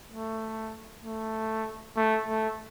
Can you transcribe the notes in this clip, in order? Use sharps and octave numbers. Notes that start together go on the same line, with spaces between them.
A3
A3
A3
A3